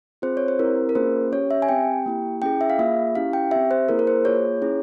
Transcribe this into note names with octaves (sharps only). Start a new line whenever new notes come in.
C4 F4 G#4 C5
C#5
C5
C4 E4 G4 A#4
A#4
A#3 C#4 F4 G#4 C5
C#4 G4 C#5
E5
G#5
C4 G4 G5
A#3 E4 G4
C#4 E4 G#4 G5
E5
F5
A#3 F4 G#4 E5
C#4 E4 G4 F5
G5
C4 G4 E5
C5
A#3 E4 G#4 A#4
A#4
C5
A#3 F4 G#4 C#5
C#4 E4 G#4